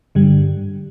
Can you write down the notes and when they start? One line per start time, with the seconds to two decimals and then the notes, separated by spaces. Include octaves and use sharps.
0.15 G2 D3 G3